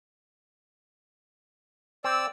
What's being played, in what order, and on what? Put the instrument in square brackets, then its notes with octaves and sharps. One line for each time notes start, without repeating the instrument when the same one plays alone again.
[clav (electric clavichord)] C4 [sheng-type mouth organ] D5 E6